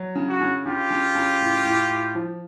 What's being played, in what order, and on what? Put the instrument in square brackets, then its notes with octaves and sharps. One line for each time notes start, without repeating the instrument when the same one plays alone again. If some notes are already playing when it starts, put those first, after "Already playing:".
Already playing: [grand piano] F#3
C#3
[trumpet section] F#4
[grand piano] C#3
[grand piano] C#3 [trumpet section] F4 G4
[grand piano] C#3
C#3
A2
A2
A2
F3